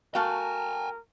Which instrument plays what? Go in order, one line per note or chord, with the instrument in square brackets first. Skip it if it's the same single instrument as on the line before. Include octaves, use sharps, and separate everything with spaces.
[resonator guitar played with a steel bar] A3 F#4 F5 [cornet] A#4 [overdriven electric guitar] G5 G#5